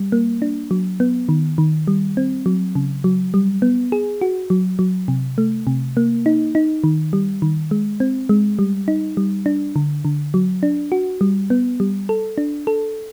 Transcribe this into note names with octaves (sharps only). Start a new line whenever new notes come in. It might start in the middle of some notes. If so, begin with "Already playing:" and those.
Already playing: G3
A#3
D4
F#3
B3
D#3
D#3
G3
C4
F#3
C#3
F#3
G3
B3
G#4
F#4
F#3
F#3
C3
A3
C3
A#3
D#4
D#4
D#3
G3
D#3
G#3
C4
G#3
G3
D#4
G3
D4
D3
D3
F#3
D4
F#4
G3
B3
G3
A4
D4
A4